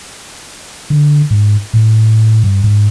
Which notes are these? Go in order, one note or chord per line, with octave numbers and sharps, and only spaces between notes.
D3
G#2
A2
G2
G#2